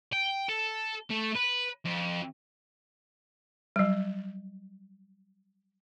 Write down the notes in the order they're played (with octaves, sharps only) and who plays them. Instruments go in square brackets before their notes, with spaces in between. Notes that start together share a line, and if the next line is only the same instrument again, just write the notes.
[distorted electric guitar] G5
A4
A3
B4
F2
[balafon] F#3 G3